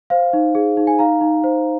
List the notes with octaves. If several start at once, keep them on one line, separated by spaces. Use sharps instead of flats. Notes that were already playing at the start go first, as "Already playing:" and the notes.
C5 F5
D#4
G#4
D#4
G#5
D#4 F5 A#5
D#4
C5